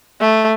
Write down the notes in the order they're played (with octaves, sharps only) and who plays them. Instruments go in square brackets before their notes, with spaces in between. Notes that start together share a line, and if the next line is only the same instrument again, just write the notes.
[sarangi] A3